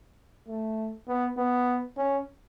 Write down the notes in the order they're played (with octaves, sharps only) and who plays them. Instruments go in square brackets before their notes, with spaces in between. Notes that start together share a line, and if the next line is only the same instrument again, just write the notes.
[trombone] A3
B3
B3
C#4